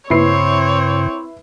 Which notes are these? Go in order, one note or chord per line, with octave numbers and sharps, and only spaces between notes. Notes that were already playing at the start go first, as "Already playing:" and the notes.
G2 C#3 C4 E4 B4 C#5 C7